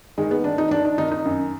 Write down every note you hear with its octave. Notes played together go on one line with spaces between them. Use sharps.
D#3 G#3
B3
D#3 D4
D#4
D#3 D4
D4
D#3 D#4
D#4
F#2